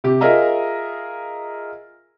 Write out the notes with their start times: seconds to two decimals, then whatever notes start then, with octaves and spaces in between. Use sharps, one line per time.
0.04 C3 G4
0.21 F4 G#4 A#4 D#5 E5 A#5